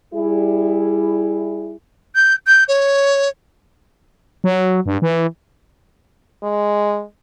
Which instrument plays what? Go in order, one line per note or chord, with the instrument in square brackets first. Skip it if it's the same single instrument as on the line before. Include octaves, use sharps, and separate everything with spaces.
[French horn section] G3 E4 G#4
[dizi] G6
G6
C#5
[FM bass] F#3
G2
E3
[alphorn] G#3